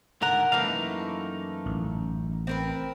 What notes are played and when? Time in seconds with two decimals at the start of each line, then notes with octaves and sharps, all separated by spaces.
0.22 G#2 D3 A#4 F#5 A#5
0.52 F#2 E3 A3 A#3 D#4 F5
1.66 A1
2.47 C4 A#4 B4